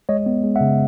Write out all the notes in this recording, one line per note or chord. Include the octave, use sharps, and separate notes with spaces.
G#3 C#5 D#5
B3
G#3
E5 F#5
C#3